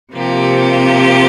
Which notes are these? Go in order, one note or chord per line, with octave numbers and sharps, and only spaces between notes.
C3 F3 A#3 G4